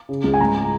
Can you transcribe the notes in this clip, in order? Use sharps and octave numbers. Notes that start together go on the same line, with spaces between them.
C#3
C#2
G#5
G#2 A#5